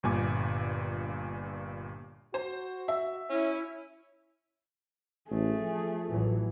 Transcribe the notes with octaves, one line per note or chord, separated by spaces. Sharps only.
G1 G2 A#2 G#5 D6
F#4 C5
E5
C#4 E4
A1 A3 G#4
F3
A1 E3 F#3